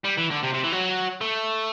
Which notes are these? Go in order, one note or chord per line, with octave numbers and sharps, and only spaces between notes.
G3
E3
D3
C3
C3
E3
F#3
A3